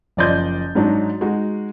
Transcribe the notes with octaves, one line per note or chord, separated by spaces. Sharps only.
F#1 F3 D5 D#5 C6 G6
G#2 F#3 D4 D#4
G#3 D#4 F#4